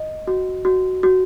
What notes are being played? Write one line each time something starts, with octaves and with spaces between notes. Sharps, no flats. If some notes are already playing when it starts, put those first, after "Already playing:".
Already playing: D#5
F#4
F#4
F#4